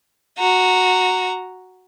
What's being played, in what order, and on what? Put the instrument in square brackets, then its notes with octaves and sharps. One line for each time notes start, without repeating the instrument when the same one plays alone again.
[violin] F#4 A#5